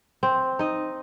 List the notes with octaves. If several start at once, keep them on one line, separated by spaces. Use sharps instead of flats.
C4
D#4 D#5